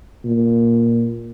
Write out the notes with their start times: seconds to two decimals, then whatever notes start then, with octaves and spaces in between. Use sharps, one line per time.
0.24 A#2